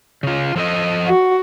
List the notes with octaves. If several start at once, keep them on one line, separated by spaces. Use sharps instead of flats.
C#3 F4
F3 A4 D#5
F#4